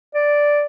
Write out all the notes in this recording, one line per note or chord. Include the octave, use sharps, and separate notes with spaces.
D5